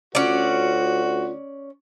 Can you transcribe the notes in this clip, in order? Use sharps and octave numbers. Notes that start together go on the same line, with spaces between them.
D2 C#4 F4 F#4 D5